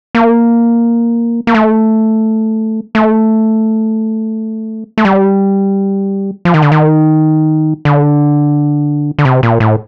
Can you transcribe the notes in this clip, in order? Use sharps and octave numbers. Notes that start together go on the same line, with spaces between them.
A#3
A#3
A3
A3
A3
G3
F3
D#3
D3
D#3
D3
D3
C3
A#2
A2